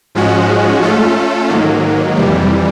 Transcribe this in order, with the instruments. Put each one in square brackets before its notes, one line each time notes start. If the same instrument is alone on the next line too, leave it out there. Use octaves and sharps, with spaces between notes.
[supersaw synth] G#2 F3 G#3 C#4 F#4
A3 C#4 F4 A4
G#2 D#3 F#3 A#3
F2 C3 E3 G3